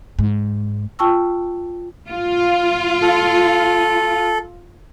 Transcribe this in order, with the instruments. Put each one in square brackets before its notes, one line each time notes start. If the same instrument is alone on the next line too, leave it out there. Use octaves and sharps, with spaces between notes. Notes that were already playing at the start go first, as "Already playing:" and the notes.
[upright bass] G#2
[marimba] F4 G5 A5 C#6 E6
[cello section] F4
[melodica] A4